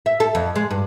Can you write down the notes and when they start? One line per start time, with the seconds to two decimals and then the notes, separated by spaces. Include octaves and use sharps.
0.06 E5
0.20 A4
0.35 F2
0.56 G#3
0.71 G2